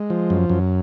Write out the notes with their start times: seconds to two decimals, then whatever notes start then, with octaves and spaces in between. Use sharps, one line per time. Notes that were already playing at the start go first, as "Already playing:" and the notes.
Already playing: G#3
0.10 F3
0.30 F#2
0.49 F#2